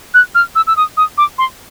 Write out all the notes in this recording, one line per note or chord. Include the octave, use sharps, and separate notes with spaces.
F#6
F6
E6
E6
D#6
D#6
D6
C6